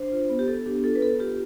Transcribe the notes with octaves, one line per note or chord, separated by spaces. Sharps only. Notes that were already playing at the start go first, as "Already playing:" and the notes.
Already playing: D4 C5
F4
B3
G4
B3 A4
D4 G4
F4 A4
B4
B3 A4
F4 G4